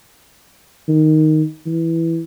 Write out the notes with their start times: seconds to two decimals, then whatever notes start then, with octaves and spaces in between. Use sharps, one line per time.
0.89 D#3
1.66 E3